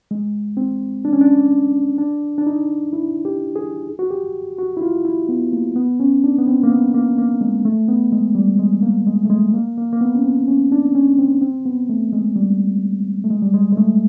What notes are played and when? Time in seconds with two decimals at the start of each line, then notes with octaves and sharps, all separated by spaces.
0.11 G#3
0.57 C4
1.05 D4
1.13 C#4
1.21 D4
1.98 D4
2.38 D4
2.47 D#4
2.93 E4
3.25 G4
3.56 G#4
3.99 F#4
4.11 G4
4.58 F#4
4.77 E4
4.82 F4
5.05 E4
5.29 B3
5.53 A#3
5.76 B3
6.00 C#4
6.24 D4
6.38 B3
6.47 C4
6.64 A#3
6.70 B3
6.94 A#3
7.18 A#3
7.41 G#3
7.65 A3
7.88 B3
8.12 G#3
8.35 G3
8.59 G#3
8.82 A#3
9.07 G#3
9.25 A3
9.30 G#3
9.54 A#3
9.78 A#3
9.93 A#3
10.01 B3
10.15 C#4
10.24 C4
10.48 C#4
10.72 D4
10.95 C#4
11.19 C4
11.41 C4
11.66 B3
11.89 A3
12.13 G#3
12.36 G3
13.24 A3
13.30 G#3
13.42 G3
13.54 G#3
13.72 G#3
13.77 A3